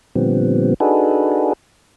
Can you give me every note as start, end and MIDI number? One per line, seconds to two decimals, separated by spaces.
0.15 0.74 46
0.15 0.74 50
0.15 0.74 53
0.15 0.74 55
0.15 0.74 59
0.15 0.74 60
0.80 1.53 62
0.80 1.53 63
0.80 1.53 66
0.80 1.53 68
0.80 1.53 69
0.80 1.53 71